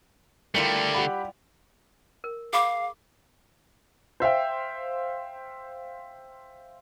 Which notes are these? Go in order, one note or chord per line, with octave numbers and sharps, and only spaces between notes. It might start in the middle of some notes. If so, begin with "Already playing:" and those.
D3 G3 A3 E4 F4 A#4
G4 F#5 B5
A#4
G#4 F5 B5 D6
C5 E5 F5 G5